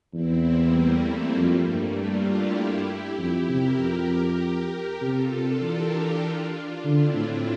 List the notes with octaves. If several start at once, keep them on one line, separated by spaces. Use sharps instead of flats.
E2 C4 E4
G3 A#3
A3
G3 A#3
F2 G3 A#3
G2 A3
D4 F4
E4 G4
F2
C3 G4 A#4
F2
C3 F4 A4
C3 D4 F4
E3 G4 A#4
D4 F4
D4 F4
D3 C4 E4
A2 C4 E4